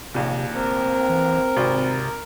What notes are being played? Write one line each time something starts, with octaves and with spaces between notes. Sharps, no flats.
A#1 D#2 C3
F1 C4 A#4
E3
G#1 C3